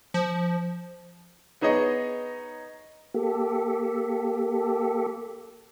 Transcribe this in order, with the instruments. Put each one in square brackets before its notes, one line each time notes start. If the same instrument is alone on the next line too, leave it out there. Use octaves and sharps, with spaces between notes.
[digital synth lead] F3
[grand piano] B3 D#4 G#4 C#5 D#5
[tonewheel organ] A#3 G4 A4